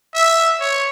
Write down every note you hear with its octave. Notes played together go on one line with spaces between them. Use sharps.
E5
C#5